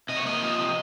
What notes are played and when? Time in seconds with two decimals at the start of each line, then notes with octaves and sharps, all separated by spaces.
0.09 C3 D#5
0.17 C#5
0.26 A#3 D#5
0.42 F3
0.58 C3